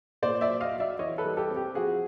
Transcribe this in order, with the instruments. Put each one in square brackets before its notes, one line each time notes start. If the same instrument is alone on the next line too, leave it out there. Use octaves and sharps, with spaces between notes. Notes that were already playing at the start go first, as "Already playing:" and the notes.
[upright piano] A#2 C5 D5
D5 E5
F#3
D#5 F5
F#3
D5 E5
E3 C#5 D#5
A4 B4
G3
G4 A4
C4
G4
F3 F#4 G#4